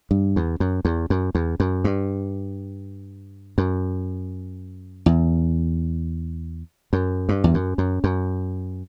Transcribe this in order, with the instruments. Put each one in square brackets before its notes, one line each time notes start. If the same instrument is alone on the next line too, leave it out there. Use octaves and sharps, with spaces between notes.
[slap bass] G2
E2
F#2
E2
F#2
E2
F#2
G2
F#2
E2
F#2
G2
E2
F#2
F#2
F#2